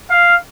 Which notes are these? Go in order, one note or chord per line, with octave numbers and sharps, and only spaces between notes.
F5